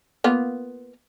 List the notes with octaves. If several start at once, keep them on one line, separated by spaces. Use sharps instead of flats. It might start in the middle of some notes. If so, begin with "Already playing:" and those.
A#3 B3 F4